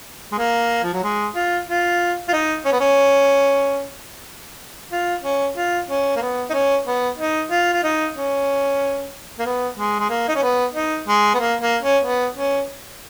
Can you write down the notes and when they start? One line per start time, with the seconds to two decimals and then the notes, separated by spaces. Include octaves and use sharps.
0.32 G#3
0.38 A#3
0.83 F3
0.93 F#3
1.03 G#3
1.35 F4
1.68 F4
2.28 F4
2.33 D#4
2.65 C#4
2.72 B3
2.80 C#4
4.92 F4
5.24 C#4
5.56 F4
5.89 C#4
6.16 A#3
6.21 B3
6.50 D#4
6.53 C#4
6.86 B3
7.19 D#4
7.50 F4
7.73 F4
7.84 D#4
8.16 C#4
9.39 A#3
9.45 B3
9.78 G#3
9.99 G#3
10.10 A#3
10.28 D#4
10.35 C#4
10.42 B3
10.75 D#4
11.08 G#3
11.34 B3
11.39 A#3
11.61 A#3
11.83 C#4
12.04 B3
12.37 C#4